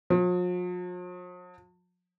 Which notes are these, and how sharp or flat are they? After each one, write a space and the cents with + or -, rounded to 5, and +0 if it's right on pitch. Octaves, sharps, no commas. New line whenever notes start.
F3 +45